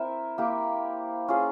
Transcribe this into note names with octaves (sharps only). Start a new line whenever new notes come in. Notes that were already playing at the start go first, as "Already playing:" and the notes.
Already playing: C4 E4 A#4 E5
A#3 E4 G4
C#4 F4 G#4